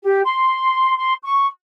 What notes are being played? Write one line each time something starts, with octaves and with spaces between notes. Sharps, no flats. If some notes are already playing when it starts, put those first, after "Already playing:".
G4
C6
C6
C#6